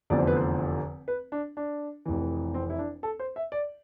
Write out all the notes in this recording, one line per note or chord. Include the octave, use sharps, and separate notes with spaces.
F1 E2 D3 F3 D5
C5
B4
C5
B4
D4
D4
F1 F2 E3
C4
E4
D4
A4
C5
E5
D5